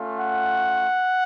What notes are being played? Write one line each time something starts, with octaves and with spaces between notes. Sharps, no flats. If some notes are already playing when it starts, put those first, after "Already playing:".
Already playing: A3 C#4 F4
F#5